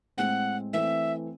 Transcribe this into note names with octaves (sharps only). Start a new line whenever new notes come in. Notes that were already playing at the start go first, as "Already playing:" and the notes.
A2 G#3 C4 F#5
E3 A3 C4 E5